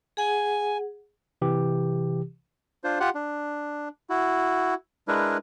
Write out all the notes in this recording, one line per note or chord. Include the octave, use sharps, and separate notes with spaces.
G#4 F#5 G#5
C3 E3 G4
D4 F4 C5
F4 G4 F#5
D4
E4 F#4
G#3 D4 E4 A#4 B4